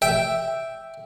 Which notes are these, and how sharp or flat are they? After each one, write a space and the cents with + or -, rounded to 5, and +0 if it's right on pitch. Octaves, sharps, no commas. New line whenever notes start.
E5 +0 G5 -5